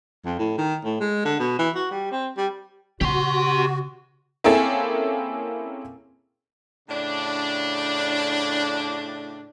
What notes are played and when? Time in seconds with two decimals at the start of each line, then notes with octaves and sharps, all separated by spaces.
0.25 F2
0.39 A2
0.58 D#3
0.85 A2
1.00 G#3
1.25 D3
1.39 B2
1.59 E3
1.75 F#4
1.91 G3
2.11 C4
2.37 G3
3.01 C#3 F#4 G4 C6
4.44 A#3 C4 C#4 E4 G#4 A4
6.89 A2 C#3 D4